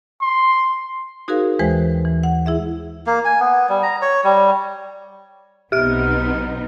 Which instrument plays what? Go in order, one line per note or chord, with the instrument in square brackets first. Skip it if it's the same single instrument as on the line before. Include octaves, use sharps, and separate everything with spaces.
[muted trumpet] C6
[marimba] D#4 F#4 G#4 A#4 C5 F5
D#2 E3 G#3 B4 C5 G5
E3
F#5
E4 G#4 E5
[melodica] A#3
G#5
B3
G3
A#5
C#5
G3
[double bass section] B1 [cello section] B3 C4 D#4 [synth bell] G4 F6